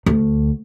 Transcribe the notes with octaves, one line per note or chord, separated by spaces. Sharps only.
D2